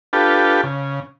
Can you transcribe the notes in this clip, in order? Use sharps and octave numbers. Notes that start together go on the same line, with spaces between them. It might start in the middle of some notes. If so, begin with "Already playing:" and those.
D4 F4 G4 A4 B4
C#3